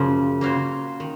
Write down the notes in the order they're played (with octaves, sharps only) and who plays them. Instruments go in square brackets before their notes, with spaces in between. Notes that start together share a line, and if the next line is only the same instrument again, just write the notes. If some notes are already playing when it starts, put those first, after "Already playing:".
Already playing: [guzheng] F#2 F3 A#3 [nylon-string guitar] C#3
[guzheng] A#3 C#4 F#4 C5 F5
D#3